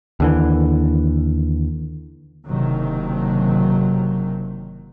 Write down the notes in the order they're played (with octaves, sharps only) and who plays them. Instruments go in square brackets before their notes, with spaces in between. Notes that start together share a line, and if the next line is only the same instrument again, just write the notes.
[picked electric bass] D#2 D3 E3
[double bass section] F#1 C3 D#3 F#3